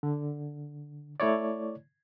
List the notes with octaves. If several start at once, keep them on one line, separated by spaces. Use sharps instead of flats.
D3
A3 E4 C#5 D5